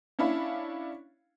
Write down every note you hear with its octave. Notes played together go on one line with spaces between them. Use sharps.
C#4 D4 E4 F5 B5